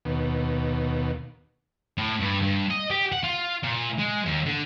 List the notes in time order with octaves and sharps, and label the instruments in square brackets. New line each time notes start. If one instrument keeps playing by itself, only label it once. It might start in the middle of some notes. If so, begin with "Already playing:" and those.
[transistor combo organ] D#2 B2
[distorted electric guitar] A2
G2
G2
D#5
G4
F#5
F4
A#2
G#3
D#2
D3